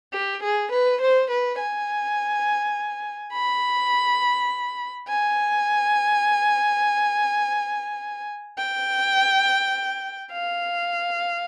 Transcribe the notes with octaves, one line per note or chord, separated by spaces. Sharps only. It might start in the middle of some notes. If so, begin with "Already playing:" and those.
G4
G#4
B4
C5
B4
G#5
B5
G#5
G5
F5